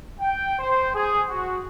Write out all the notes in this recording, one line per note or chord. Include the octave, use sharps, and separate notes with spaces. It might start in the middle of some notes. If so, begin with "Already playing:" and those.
G5
C5
G#4
F#4